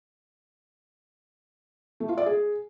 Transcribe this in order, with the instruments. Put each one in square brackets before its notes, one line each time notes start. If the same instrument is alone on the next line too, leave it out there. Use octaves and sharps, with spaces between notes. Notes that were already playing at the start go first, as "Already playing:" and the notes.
[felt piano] A3
F4
D5
G#4